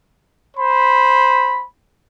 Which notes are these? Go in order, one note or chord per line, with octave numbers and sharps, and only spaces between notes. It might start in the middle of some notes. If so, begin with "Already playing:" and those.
C5 B5